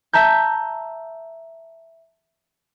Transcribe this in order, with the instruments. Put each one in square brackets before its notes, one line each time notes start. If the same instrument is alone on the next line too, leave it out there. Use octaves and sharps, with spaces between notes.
[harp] E5 A5 A#5 G6